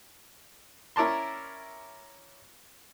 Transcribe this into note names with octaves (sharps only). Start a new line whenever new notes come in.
C#4 E4 A#4 D5 A5 C6